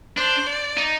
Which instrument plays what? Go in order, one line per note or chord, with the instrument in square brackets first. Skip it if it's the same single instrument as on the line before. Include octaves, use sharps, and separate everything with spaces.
[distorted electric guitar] D4 [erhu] C5
[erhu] D5
[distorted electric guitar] D#4